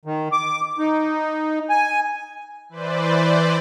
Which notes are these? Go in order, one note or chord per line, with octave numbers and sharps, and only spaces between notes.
D#3
D6
D#4
G#5
E3 B4 C5 D5